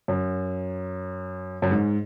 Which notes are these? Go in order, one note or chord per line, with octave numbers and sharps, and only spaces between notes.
F#2
F#2
G#2